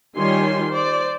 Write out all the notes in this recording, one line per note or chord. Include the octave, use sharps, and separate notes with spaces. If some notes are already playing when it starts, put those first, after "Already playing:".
D#3 G3 F4 C#5 G#5 C6
C5 D5